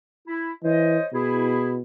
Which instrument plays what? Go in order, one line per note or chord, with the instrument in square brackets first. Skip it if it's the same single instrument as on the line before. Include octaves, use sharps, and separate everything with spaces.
[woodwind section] E4
[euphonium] E3 [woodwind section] C5 C#5 D#5
[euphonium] B2 [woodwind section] E4 G#4